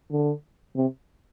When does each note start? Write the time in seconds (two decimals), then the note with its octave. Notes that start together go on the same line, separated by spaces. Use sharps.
0.11 D3
0.76 C3